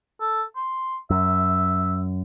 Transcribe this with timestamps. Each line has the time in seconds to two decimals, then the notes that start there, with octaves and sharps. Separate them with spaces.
0.20 A4
0.56 C6
1.10 F#2 E5